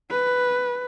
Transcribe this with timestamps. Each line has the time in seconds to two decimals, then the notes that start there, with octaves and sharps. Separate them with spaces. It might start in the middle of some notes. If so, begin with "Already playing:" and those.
0.11 B4